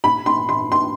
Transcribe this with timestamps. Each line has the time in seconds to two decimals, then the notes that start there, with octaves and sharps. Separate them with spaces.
0.04 B5
0.26 C6
0.49 C6
0.72 C6